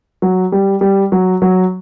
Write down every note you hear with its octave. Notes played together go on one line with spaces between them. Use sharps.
F#3
G3
G3
F#3
F#3